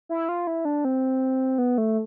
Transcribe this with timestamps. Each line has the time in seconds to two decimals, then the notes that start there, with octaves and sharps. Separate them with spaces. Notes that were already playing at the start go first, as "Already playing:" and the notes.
0.09 E4
0.29 F4
0.47 E4
0.65 D4
0.85 C4
1.58 B3
1.78 A3